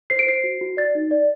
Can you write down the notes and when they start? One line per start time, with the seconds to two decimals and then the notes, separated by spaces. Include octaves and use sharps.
0.10 C5 C7
0.19 D7
0.27 C5 C7
0.44 F#4
0.61 F#4
0.77 D5 A6
0.95 D#4
1.11 D5